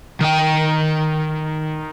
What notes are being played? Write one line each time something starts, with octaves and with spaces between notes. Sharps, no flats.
D#3 G5